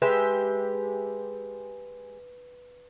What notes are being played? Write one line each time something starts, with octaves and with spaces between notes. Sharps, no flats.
G#3 G4 B4 E5